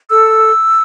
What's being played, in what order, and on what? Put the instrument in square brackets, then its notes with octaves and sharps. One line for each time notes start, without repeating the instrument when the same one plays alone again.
[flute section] A4 E6